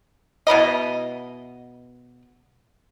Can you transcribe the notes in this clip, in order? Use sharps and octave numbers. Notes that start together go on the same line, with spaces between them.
B2 E4 B4 D#5